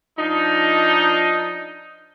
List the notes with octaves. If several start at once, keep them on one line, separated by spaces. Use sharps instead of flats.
F3 D4 D#4